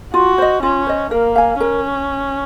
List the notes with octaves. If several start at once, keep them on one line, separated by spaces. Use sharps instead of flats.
F4 F#4
C5 D#5
C#4 F4
C5 D#5
A#3 A#4
F5 G#5
C#4 A#4